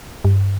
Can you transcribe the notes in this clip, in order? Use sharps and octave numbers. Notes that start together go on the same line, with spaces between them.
G2